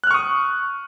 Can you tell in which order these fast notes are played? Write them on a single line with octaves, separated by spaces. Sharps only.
F#6 F6 C#6 D#6